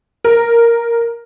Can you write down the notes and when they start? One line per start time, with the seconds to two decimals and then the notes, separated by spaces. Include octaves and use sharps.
0.24 A#4